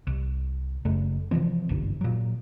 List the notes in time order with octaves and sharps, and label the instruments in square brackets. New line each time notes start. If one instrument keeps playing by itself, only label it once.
[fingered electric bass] C2
F#1 F#2 C#3 A3
C3 E3 F3 C4
F#1 B1 G2 D3
A#2 F#3